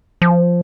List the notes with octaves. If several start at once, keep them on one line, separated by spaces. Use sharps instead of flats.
F3